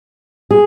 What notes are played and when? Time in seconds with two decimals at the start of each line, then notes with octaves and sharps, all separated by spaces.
0.51 G#4